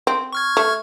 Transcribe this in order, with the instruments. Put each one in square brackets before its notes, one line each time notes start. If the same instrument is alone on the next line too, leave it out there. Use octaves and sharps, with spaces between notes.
[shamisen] C4
[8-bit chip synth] C#6 F6 G#6
[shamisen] A3